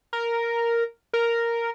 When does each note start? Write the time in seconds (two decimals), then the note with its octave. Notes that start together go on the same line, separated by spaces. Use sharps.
0.13 A#4
1.13 A#4